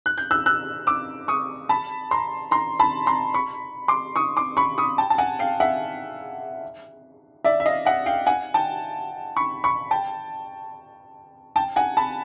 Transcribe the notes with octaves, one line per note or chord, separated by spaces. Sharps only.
F#6
G6
E6 F#6
E6 F#6
D6 E6
C#6 D#6
A5 B5
A#5 C6
A#5 C6
A5 B5
A#5 C6
B5 C#6
C6 D6
C#6 D#6
C6 D6
B5 C#6
C#6 D#6
G5 A5
A5
F#5 G#5
F5 G5
E5 F#5
D5 E5
E5
D#5 F5
E5 F#5
F5 G5
F#5 G#5
G5 A5
B5 C#6
B5 C#6
G5 A5
G5 A5
F#5 G#5
A5 B5